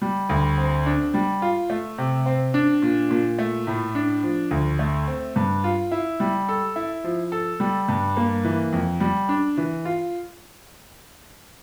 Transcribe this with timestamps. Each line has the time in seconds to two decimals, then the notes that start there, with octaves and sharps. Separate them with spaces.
0.02 G3
0.29 D2
0.58 C4
0.86 D4
1.14 G3
1.42 F4
1.70 A3
1.98 C3
2.26 C4
2.54 D4
2.82 A#2
3.11 A#2
3.39 A3
3.67 A2
3.95 D4
4.23 F3
4.51 D2
4.79 A3
5.08 C4
5.36 G2
5.64 F4
5.92 E4
6.20 G3
6.49 A4
6.76 E4
7.04 F3
7.32 A4
7.60 G3
7.89 G2
8.17 A#3
8.45 E3
8.73 F2
9.00 G3
9.29 D4
9.57 E3
9.85 F4